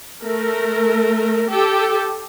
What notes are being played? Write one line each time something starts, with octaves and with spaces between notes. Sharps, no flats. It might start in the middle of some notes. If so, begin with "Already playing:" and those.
A3 A#4
G4 A4